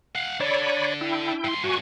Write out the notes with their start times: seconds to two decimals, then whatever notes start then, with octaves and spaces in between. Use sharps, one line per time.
0.15 F5 F#5
0.40 D4 A4 C#5 D5 B5
1.01 E4 G5
1.44 G2 C6
1.64 G2 A#2 F#4 G#5 C#6